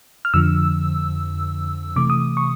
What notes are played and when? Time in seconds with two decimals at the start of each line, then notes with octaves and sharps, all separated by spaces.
0.25 F6
0.34 F2 D3 F3 E6
1.96 C3 E3 A3 D6
2.10 D#6
2.37 C#6